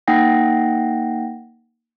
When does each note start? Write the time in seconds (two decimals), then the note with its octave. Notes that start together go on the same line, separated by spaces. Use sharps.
0.08 A#3 D#4 F#5 G5 A#6